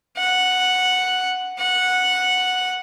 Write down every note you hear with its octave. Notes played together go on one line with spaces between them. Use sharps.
F#5
F#5